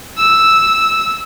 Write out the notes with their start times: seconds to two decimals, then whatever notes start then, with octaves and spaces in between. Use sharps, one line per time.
0.17 E6